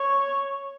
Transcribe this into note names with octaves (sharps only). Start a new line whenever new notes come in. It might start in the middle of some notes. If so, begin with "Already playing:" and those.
Already playing: C#5